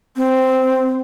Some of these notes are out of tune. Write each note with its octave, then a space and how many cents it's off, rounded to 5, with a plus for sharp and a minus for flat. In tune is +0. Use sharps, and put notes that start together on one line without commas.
C4 -5